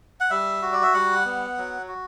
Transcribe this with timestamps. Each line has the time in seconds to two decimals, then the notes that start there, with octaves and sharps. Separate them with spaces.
0.20 F#5
0.30 G3 E5
0.62 F#4
0.73 D5
0.83 E5
0.94 G3 F#5
1.25 B3
1.57 F#3
1.88 F#4